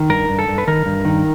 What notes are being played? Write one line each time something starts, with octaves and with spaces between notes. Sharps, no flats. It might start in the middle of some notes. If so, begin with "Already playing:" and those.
Already playing: D#3
G2 A#4
G2
A4
G2
B4
D#3 A#4
G2
D#3